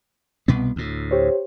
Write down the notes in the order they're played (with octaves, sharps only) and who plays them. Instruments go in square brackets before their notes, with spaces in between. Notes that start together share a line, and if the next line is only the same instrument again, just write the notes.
[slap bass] C2 B2 B3
D2 A2
[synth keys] G4 C5 C#5